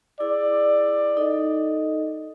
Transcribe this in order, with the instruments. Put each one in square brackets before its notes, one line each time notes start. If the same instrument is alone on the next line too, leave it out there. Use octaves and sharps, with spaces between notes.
[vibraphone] E4 G#4 E6 [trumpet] D5
[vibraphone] D#4 A4 D#5